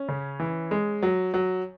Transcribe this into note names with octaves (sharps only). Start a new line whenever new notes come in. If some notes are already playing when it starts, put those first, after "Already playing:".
Already playing: C#4
C#3
E3
G#3
F#3
F#3